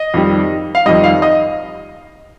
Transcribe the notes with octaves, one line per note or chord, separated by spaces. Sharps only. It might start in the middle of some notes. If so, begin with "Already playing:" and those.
Already playing: D#5
F2 D#3 G3
F5
F2 D#3 G3 D#5
F5
D#5